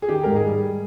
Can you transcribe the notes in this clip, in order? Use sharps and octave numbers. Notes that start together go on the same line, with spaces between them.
G#4
D#3 G4
G#2 A#4
G#4
G3